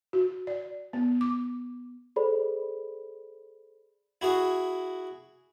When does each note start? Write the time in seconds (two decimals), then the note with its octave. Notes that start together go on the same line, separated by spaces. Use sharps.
0.13 F#4
0.47 D5
0.93 B3
1.21 D6
2.16 G#4 A4 C5 D5 B5
4.21 E4 F#4 G#4